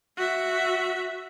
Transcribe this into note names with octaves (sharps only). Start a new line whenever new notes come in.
F#4 E5